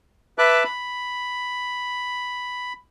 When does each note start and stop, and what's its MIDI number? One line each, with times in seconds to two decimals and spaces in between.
0.38 0.64 71
0.38 0.64 76
0.38 0.64 81
0.38 0.64 86
0.38 0.64 90
0.64 2.73 83